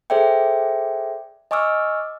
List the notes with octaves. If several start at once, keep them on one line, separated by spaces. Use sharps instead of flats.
G#4 A4 C5 D5 E5 G5
D#5 G#5 C#6 D6 E6 F6